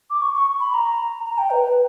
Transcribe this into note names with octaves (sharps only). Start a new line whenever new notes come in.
D6
C#6
C#6
B5
A#5
A#5
G5
B4
B4